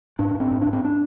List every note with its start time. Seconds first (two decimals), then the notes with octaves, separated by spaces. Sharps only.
0.19 G#2 D4
0.35 G#2
0.40 C4
0.51 G#2
0.61 D4
0.67 G#2
0.73 C4
0.85 D4